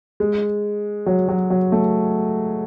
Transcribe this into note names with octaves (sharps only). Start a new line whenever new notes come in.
G#3
F#3
F#3
F#3
A3